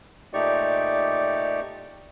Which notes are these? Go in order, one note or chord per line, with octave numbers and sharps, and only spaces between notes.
A#2 A3 D#4 G4 D5 C#6